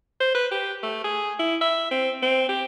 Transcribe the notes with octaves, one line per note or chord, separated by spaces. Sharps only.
C5
B4
G4
A3
G#4
E4
E5
C4
C4
G4